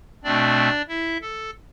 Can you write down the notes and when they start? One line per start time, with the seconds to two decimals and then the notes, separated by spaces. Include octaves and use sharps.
0.24 B2 A3 C4 D4 D5
0.88 E4 E5
1.21 A4